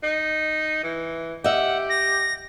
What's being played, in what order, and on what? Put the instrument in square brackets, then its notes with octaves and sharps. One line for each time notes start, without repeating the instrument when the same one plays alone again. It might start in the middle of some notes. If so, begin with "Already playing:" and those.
[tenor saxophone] D#4
E3
[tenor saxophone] G4 [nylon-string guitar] D#5 E5 [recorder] F#5
[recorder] A#6